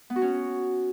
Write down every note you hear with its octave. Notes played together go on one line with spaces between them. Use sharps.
B3
F#4
C#4